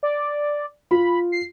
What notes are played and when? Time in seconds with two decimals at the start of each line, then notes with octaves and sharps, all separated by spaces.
0.03 D5
0.91 F4 B5
1.32 C7